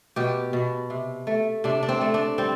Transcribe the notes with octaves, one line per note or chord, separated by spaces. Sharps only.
B2 G4
B2
C3
A3
C3 D4
D4
C4
A3
D4
G3 C4